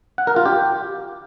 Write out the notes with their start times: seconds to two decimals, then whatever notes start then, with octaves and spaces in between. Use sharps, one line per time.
0.18 F#5
0.27 A#4
0.36 F4
0.46 G4